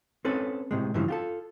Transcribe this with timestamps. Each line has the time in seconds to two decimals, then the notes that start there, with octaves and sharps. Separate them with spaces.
0.25 C4 C#4 A4 B4
0.71 A2 C3 G#3
0.94 G2 C#3 E3 F3
1.08 F4 G4 A4